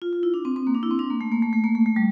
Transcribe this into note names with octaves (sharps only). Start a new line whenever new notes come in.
F4
F4
E4
D4
C4
C4
A#3
D4
E4
C4
D4
A#3
A3
A#3
A3
A3
A#3
A3
A3
G3